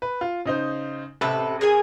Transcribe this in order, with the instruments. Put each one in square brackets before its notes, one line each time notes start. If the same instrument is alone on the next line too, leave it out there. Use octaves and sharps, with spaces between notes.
[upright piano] B4
F4
C#3 D#4 C5
[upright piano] A1 [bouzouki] C3 A4 B4
[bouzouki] G#4 A#4 G#5